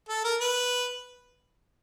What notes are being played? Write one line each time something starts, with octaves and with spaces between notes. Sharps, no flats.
A4
A#4
B4